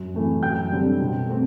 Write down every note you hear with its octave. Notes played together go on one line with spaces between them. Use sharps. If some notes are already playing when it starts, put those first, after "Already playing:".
Already playing: F#2
E3 A3 C4
F#2 G5 G6
D3 G3 C4
B2
A3 C4